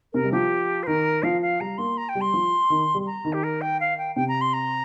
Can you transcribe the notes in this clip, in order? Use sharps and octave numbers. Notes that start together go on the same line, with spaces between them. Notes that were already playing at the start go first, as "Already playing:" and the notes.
C3 A#4
G3
F3 G4
C5
D#3 A#4
F3 F5
F5
G3 A#5
A#3 C6
A#5
G5
G3
C6
F3
D#3
G3
A#5
D#3
G4
A#4
G5
F5
G5
C3 G5
A#5
C6
A#5